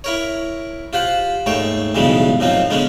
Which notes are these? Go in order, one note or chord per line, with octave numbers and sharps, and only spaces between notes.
E4 A#4 C#5
F4 G4 C5 F#5
D#2 G#2 A3 C#5 G5
B1 G2 C#3 E3 G#3 B3
F#2 A#2 F3 F#3 C4 D#4
D3 G#3 B3 C#4 D4